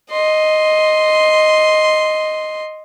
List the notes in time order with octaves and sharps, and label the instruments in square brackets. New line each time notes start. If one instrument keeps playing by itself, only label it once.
[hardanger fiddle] D#5 C6